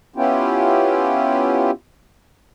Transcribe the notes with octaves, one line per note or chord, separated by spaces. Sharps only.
B3 C#4 E4 F4 G4